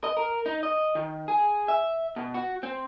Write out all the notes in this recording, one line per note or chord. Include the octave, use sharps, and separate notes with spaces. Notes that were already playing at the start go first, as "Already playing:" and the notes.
D#5
A#4
D#4
D#5
D#3
G#4
E5
B2
F#4
C4